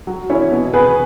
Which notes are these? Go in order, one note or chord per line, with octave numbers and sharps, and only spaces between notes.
F#3
C#4 E4 C#5
B2
B3 G#4 B4